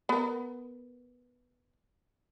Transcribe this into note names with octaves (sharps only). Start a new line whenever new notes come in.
B3 A#4